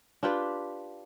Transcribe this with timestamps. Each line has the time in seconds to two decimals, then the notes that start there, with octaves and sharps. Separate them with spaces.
0.23 D4 F4 G4 B4